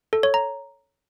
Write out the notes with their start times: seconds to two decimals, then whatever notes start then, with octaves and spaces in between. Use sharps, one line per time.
0.13 A4
0.23 C#5
0.34 A#5